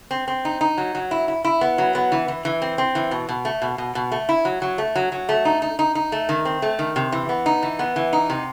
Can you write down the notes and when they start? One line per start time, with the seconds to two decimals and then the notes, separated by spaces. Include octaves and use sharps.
0.11 C4
0.28 C4
0.45 D#4
0.61 D#4
0.78 F#3
0.95 F#3
1.11 E4
1.28 E4
1.45 E4
1.61 B3
1.78 F#3
1.95 B3
2.12 E3
2.28 E3
2.45 E3
2.62 C4
2.78 C4
2.95 E3
3.11 B2
3.29 B2
3.45 A3
3.62 B2
3.78 B2
3.95 B2
4.12 A3
4.29 E4
4.45 F#3
4.62 F#3
4.78 A3
4.95 F#3
5.12 F#3
5.29 A3
5.45 D#4
5.62 D#4
5.79 D#4
5.95 D#4
6.12 A3
6.29 D#3
6.45 C4
6.62 A3
6.79 D#3
6.96 C3
7.12 E3
7.29 B3
7.46 D#4
7.63 E3
7.79 B3
7.96 E3
8.13 D#4
8.30 C3